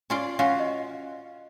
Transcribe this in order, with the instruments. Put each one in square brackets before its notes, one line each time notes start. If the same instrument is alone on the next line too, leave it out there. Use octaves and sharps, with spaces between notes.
[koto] C#4 F4 D5
[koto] C#4 F4 F#4 [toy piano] F5
[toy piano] D#5